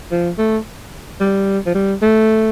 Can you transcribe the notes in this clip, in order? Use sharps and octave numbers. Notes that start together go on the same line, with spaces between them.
F3
A3
G3
F3
G3
A3